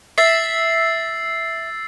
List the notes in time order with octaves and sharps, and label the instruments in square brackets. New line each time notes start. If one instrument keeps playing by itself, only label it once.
[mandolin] E5 [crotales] E6 A6 C7